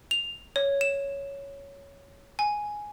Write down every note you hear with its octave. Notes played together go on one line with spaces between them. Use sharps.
F7
C#5
E7
G#5